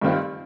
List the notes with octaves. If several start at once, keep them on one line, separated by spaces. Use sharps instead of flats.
G2 D#3 C4 F4